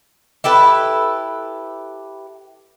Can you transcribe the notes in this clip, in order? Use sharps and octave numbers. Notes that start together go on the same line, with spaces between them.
E4 G4 A4 B4